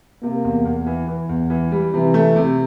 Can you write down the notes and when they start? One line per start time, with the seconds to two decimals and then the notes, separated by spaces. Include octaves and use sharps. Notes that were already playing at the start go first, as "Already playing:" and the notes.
0.23 C3 A#3
0.44 E2
0.65 E2
0.86 E3
1.08 E3
1.29 E2
1.50 E3
1.72 G3
1.93 C3 E3
2.14 A3
2.36 C3